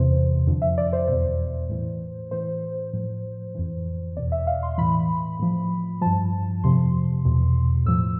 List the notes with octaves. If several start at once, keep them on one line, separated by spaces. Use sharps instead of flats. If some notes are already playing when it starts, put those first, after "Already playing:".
Already playing: E2 C3 E3 C5
F2 D3 F3
E5
D5
C5
E2 B2 C5
A2 E3
A2 E3 C5
A2 F3
F2 E3
E2 B2 D5
E5
F5
C6
A2 E3 B5
A2 F3
G2 F3 A5
F2 C3 F3 C6
E2 B2
A2 F3 E6